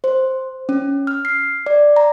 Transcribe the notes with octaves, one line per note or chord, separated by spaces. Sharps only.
C5
C#4
F6
C7
D5
A#5